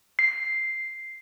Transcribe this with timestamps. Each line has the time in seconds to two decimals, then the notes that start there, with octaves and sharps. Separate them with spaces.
0.19 C7